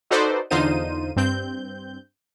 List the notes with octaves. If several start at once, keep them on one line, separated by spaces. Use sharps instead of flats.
D#4 F#4 A4 B4 C5 D5
E2 D3 D#4 F4 C5 D#7
G2 C4 G6